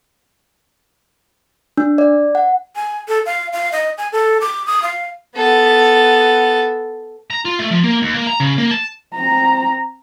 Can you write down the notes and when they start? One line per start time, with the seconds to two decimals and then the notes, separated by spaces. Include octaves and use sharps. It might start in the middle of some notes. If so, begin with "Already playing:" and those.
1.77 D4
1.98 D5
2.35 F#5
2.76 G#5
3.08 A4
3.26 F5
3.53 F5
3.72 D#5
3.98 G#5
4.12 A4
4.41 D6
4.67 D#6
4.82 F5
5.36 B3 A4
7.31 A#5
7.45 F4
7.59 A3
7.71 F3
7.83 A#3
8.02 D#2
8.14 A#3
8.27 A#5
8.40 C#3
8.58 A#3
8.71 A5
9.15 C4 A#5